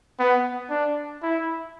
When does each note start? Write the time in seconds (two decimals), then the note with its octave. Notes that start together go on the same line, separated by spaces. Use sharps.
0.19 B3
0.70 D4
1.22 E4